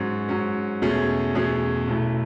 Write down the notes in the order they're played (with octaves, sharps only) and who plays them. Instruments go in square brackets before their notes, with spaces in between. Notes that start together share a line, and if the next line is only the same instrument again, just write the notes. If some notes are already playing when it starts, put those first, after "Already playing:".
Already playing: [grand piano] G#2 F#3 C#4
G#2 F#3 C#4
E2 B2 A3 C#4 G#4
E2 B2 A3 C#4 G#4
B1 B2 A3 E4